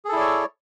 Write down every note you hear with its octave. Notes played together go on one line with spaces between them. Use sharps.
E4 G#4 A4 C#5 D5